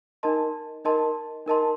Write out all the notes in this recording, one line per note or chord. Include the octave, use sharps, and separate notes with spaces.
D#4 A#4 D#5 A5 C6
D#4 A#4 D#5 A5 C6
D#4 A#4 D#5 A5 C6